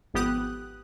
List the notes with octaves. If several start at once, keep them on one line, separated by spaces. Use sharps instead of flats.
G#1 F2 B3 G4 D#6 F#6